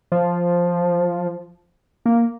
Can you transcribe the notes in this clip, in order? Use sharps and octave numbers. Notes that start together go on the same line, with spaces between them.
F3
A#3